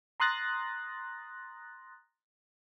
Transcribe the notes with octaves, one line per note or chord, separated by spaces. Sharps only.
A#5 C6 D#6 F#6 A6 A#6